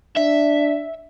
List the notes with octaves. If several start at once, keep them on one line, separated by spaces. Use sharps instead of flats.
D4 E5